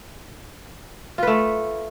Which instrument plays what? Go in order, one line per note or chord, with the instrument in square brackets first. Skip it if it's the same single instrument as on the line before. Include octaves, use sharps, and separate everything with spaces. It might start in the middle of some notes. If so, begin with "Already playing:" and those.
[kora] F4
B4
A3